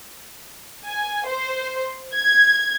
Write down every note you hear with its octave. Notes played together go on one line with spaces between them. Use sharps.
G#5
C5
G#6